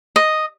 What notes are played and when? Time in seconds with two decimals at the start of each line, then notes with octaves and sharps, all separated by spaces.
0.16 D#5